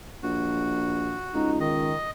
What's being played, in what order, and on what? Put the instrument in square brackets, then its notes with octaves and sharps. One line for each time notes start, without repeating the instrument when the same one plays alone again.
[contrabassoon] A#1 [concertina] F#4
[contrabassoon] C#2 [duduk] D#4
[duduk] D#3 [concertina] D#5